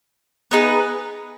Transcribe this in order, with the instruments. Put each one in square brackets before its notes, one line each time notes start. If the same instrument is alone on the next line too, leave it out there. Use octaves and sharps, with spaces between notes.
[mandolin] B3 D#4 G#4 B4